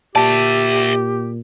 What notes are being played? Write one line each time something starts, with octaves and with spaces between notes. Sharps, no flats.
A#2 G4 D5 E5 A5